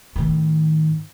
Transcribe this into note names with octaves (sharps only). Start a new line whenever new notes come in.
A2 D#3